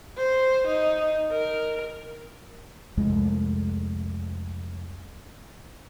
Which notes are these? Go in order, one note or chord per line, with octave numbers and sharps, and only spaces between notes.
C5
D#4
A#4
C2 F2 G#3 A3